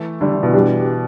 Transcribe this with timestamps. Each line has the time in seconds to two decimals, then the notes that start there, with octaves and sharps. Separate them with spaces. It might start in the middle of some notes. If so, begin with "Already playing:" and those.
Already playing: E3 A3
0.21 D3 G3
0.32 D3
0.43 B2 E3
0.54 G3 D4 G4